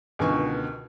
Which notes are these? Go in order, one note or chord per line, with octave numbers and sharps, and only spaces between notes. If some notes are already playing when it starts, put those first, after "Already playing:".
C#2 B2 D3 D#3 G#5 C#6